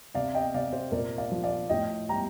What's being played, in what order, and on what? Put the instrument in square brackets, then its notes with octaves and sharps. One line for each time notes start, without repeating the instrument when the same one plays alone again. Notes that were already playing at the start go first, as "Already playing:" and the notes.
[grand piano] C3 D5 F5
D#5 G5
C3 D5 F5
C5
A#2 A#4 D5
D5 F5
F3
D5 F5
A2 D#5 G5
G3 G5 A#5